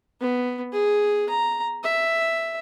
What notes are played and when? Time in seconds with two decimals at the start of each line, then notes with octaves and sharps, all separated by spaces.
0.21 B3
0.72 G#4
1.29 A#5
1.84 E5